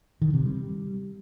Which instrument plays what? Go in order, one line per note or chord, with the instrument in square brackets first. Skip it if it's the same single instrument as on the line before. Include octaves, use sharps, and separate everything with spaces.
[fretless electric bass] D#3
C3
G3